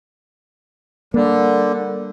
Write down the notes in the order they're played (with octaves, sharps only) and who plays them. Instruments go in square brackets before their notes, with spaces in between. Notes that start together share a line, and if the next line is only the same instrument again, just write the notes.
[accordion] D3 [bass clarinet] G3 [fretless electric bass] A#3